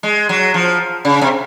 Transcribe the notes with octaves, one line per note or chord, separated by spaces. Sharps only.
G#3
F#3
F3
C#3
C3